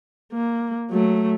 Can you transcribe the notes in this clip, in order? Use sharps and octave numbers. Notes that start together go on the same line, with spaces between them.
A#3
F#3 A3